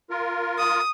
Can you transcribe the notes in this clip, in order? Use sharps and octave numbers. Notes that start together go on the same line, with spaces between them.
F4 A#4
D#6